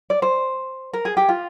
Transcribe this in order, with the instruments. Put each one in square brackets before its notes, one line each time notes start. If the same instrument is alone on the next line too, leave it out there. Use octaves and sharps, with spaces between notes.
[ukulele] D5
C5
A#4
G#4
G4
F4